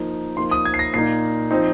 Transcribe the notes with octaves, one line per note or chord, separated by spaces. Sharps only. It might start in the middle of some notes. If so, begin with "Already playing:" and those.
Already playing: F3 A#3 D#4
F3 A#3 D#4 C6
D#6
G#6
C7
A#6
A#2 A#3 D#4 C7
F3 C4 D#4